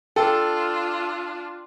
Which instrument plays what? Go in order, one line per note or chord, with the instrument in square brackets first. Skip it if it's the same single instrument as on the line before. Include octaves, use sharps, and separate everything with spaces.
[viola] D4 F4 [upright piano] A4 [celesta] G5 E6